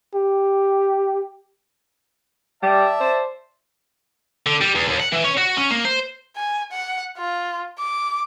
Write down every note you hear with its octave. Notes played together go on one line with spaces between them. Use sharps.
G4
G3 D5 E5 A5
C5
D3
G3
E2
D#2
F#5
E3
C#4
F#4
C#4
A#3
C5
G#5
F#5
F4
D6